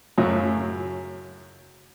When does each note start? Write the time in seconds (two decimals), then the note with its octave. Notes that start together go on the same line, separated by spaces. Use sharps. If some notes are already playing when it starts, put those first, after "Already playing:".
0.18 F#2 A2 C#3 F#3